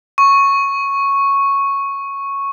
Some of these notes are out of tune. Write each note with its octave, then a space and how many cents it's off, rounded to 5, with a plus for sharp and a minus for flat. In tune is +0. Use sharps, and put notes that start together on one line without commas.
C#6 -5